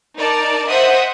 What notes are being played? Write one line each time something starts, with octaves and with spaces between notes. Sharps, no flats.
D#4 A#4 D5 A5
C5 D#5 E5 F#5 D#6